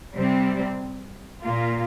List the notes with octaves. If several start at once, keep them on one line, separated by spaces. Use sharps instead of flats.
C3 G3 C4
A#2 A#3 F4